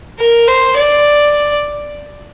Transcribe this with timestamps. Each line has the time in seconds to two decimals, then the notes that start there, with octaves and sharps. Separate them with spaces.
0.19 A#4
0.47 C5
0.77 D5